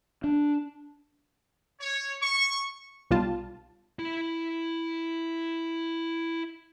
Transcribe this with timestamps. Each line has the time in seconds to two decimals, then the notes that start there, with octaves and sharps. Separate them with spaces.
0.24 D4
1.80 C#5
2.21 C#6
3.11 B1 G3 F4 A5
3.99 E4 B5